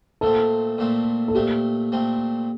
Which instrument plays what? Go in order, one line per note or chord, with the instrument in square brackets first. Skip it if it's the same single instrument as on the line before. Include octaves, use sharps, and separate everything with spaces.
[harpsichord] A#2 A3 C4 [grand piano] A4
[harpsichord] A#2 A3 C4
[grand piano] A4
[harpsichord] A#2 A3 C4 [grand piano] G4
[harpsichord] A#2 A3 C4